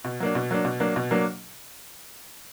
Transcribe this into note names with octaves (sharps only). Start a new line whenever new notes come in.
B2
F#3 A#3 D4
B2
F#3 A#3 D4
B2
F#3 A#3 D4
B2
F#3 A#3 D4